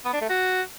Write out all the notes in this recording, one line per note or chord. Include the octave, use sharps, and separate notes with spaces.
B3
D4
A3
F#4